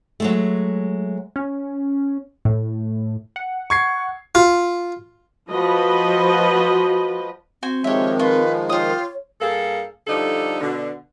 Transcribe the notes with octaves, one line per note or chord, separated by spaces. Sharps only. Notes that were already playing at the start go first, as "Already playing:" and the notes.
F#3 G#3 A3
C#4
A2
F#5
C#6 G#6 C7
F4
F3 F#4 B4 D#5
C4 F#4 C5 G#5
D#3 F3 G#3 G4 C#5 E5
F4 B4 C#6
F4 G4 C#5 D#6
G2 A#3 G#4 A4
D3 F3 G3 D#4 A4
B2 D3